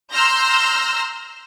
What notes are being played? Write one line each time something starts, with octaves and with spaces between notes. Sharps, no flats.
A#5 C6 E6 F6 G6 A#6